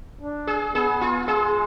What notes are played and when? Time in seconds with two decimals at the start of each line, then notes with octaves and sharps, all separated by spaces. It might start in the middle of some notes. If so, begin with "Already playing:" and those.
0.21 D4
0.47 G#4
0.74 B3 G#4
1.01 F4
1.27 G#3 G#4